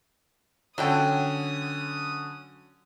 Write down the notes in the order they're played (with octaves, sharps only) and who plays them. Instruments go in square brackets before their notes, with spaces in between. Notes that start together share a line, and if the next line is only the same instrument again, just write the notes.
[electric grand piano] D3 C#4 [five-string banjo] F#3 A4 G5 [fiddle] D#6